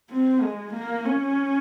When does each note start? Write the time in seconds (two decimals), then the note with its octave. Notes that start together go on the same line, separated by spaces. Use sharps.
0.11 C4
0.42 G#3
0.74 A#3
1.05 C#4